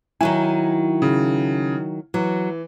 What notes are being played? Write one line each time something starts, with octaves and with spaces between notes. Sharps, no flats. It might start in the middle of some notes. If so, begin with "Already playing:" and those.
D#3 F#3 E4 G#5
C#3
E3 F#3